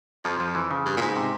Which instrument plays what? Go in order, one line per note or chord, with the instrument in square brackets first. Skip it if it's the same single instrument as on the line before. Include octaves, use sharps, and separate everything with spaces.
[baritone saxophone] F2 [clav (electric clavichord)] F3
[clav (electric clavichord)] F3
E3
C#3
[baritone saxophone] G2
A#2
G#2
[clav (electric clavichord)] C3